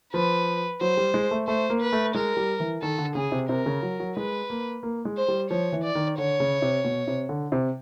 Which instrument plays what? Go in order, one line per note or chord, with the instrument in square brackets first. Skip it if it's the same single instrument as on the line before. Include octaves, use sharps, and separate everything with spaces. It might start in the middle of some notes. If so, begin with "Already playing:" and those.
[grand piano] F3 [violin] B4
[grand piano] F#3 [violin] C5
[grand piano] G3
G#3
A3
[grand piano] A3 [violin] C5
[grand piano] A#3
[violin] B4
[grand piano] A3
[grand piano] G#3 [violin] A#4
[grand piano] G3
E3
[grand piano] D#3 [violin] A4
[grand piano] D3
[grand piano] C#3 [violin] G#4
[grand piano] C3
[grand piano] C3 [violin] A#4
[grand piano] C#3
F#3
F#3
[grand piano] G#3 [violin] B4
[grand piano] A#3
A#3
G#3
[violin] C5
[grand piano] G3
[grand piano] F3 [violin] C#5
[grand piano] E3
[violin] D5
[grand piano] D#3
[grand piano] D3 [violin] C#5
[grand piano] C#3
C3
B2
C3
D3
C3